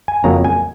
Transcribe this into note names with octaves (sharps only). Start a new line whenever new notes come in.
G#5
F2 C#3 F#3 A#3 A#5
G#5